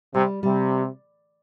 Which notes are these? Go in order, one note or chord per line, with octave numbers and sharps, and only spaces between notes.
C3 G3
C3 G3